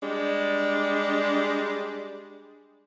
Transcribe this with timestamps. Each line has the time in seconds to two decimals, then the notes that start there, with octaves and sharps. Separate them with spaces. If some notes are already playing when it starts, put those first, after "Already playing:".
0.03 G3 G#3 D4